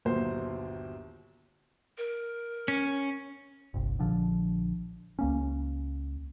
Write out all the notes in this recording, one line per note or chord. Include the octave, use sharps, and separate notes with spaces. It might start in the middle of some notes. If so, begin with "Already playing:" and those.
G1 D#2 A#2 F#3 C5
A#4
C#4
G1 C2
A#1 D3 F3
C#2 A#3 C#4